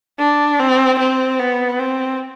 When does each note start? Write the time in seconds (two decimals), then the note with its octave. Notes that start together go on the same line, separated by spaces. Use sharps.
0.19 D4
0.59 C4
0.99 C4
1.39 B3
1.79 C4